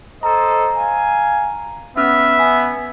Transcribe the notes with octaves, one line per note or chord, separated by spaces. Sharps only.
A4 C5 D#5 A#5
F5 G#5
B3 C#4 E5 F6
G#5